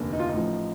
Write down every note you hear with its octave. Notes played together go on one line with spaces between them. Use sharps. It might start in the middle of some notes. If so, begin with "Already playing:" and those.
Already playing: F1 D#2 D3
D#4
F4
D#4
A1 A2 F3